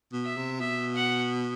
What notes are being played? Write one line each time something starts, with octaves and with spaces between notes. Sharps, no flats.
B2
E5
C3
B2 E5
F#5